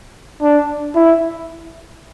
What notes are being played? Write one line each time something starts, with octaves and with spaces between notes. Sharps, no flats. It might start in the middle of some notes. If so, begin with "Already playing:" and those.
D4
E4